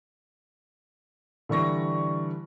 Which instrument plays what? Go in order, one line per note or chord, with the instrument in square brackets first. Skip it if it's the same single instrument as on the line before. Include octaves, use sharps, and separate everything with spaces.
[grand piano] D3 E3 G3 C#6 A#6